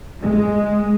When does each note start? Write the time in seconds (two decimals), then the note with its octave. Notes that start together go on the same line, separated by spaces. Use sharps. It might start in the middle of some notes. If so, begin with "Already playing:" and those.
0.22 G#3